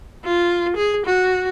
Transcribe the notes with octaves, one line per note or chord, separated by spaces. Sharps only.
F4
G#4
F#4